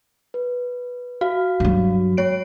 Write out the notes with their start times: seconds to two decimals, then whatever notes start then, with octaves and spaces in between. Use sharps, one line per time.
0.34 B4
1.21 F#4 F5
1.60 G2 F#3
2.17 G#3 C#5 D7